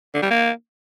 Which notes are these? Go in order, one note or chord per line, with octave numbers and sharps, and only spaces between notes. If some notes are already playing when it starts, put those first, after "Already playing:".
D3
G3
A#3